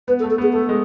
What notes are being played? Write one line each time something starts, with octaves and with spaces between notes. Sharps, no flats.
B3 B4
A4
A3
A4
B3 G#4
A3 A4
G#3